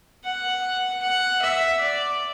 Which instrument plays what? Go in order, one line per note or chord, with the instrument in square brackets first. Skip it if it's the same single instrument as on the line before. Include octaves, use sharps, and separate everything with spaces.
[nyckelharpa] F#5
F#5
E5
D5